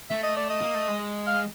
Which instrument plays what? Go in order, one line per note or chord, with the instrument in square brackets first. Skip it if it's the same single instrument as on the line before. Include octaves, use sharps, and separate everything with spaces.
[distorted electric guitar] A3 [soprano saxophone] E5
[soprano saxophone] D#5
D5
D#5
[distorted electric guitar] A#3
A3
G#3
[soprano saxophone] F5